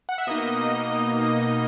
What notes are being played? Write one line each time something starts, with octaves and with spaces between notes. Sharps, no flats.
F#5
E5
B2 A#3 D#4 D#5